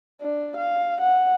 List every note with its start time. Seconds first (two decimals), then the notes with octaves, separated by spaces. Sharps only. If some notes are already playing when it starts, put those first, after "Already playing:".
0.21 D4
0.57 F5
1.01 F#5